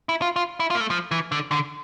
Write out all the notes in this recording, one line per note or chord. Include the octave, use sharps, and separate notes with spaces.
E4
F4
F4
E4
F4
A#3
A3
F3
E3
D3
D3